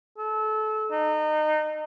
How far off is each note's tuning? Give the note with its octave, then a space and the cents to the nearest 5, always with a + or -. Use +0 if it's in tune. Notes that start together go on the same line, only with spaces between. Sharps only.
A4 -25
D#4 -25